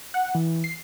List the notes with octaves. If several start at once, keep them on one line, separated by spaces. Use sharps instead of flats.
F#5
E3
C7